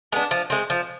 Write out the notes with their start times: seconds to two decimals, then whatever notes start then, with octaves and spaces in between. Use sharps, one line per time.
0.12 G#3 B3 D4
0.31 F3
0.50 G#3 C4
0.70 F3